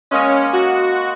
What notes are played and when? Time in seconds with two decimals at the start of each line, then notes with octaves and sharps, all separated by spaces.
0.11 G#3 A#3 C#4 D#5
0.53 F#4